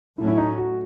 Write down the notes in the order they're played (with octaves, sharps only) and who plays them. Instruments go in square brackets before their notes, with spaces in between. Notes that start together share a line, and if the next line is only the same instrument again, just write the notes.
[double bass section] A2 F#3 A3 C#4 [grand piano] E4
[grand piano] E4
D#4
F#4